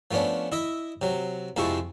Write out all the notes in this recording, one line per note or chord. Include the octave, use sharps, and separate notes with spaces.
F3 A3 B3 C#4 D4
E4 D#5 E5
C3 F#3
F2 C3 F3 G#3 E4 C#6